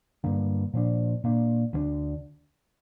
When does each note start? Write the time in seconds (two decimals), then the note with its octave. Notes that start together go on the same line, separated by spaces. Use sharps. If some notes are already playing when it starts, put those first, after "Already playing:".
0.24 G2 D3 A#3
0.73 A#2 F3 D4
1.24 A#2 A#3 D4
1.73 D2 D3 A#3 D4